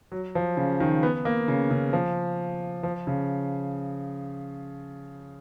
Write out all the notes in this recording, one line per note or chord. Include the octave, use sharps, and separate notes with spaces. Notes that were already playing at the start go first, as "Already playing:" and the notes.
F#3
F3
C#3
D#3
B3
A#3
C#3
C#3
F3
F3
C#3